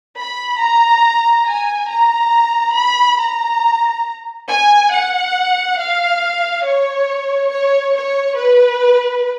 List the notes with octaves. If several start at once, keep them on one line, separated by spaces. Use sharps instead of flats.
B5
A#5
G#5
A#5
B5
A#5
G#5
F#5
F5
C#5
C#5
C#5
B4